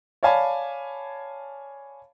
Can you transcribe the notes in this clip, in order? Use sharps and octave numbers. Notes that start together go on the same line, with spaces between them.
C#5 D5 F5 G#5 A5 B5